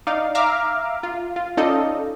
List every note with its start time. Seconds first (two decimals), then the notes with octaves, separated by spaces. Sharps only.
0.07 D#4 D5 F5
0.35 E5 F5 A#5 D6 F6
1.03 F4
1.36 F4
1.57 C#4 D#4 F4 A4 D5 D#5